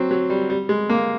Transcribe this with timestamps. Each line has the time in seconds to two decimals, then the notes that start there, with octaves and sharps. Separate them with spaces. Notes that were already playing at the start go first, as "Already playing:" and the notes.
Already playing: F#3 C4
0.11 F#3
0.30 G3
0.50 G3
0.69 G#3
0.89 A#3